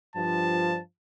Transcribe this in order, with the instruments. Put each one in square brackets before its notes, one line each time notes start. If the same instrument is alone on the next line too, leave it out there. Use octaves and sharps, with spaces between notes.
[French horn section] G2 F3 [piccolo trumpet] A5